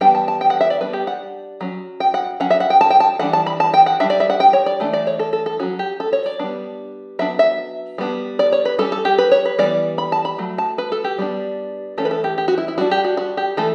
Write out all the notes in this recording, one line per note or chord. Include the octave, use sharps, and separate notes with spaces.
E3 G3 B3 D4 G5
A5
A5
G5
F#5
E5
D5
G3 B3 D4 B4
G4
F#5
F#3 C#4
G5
F#5
F#3 C#4 F#5
E5
F#5
G5
A5
G5
A5
E3 G3 D4 F#5
A5
B5
A5
G5
F#5
G3 D4 E5
D5
E5
F#5
G5
C#5
D5
E3 A3 D4
D5
C#5
A4
A4
A4
F#3 C#4 F#4
G4
A4
C#5
D5
G3 B3 D4
F#3 B3 D4 E5
E5
G3 B3 D4
D5
C#5
B4
G3 C#4 A4
A4
G4
B4
C#5
B4
E3 G3 B3 D5
B5
A5
B5
F#3 A3
A5
B4
A4
G4
G3 B3 D4
E3 A3 C#4 A4
B4
A4
G4
G4
F#4
E4
E4
G3 D4 F#4
G4
F#4
F#4
G4
E3 A3 A4